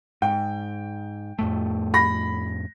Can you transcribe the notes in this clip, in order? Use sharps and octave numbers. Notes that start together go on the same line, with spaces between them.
G#2 G5
F2 A2 A3
B5 A#6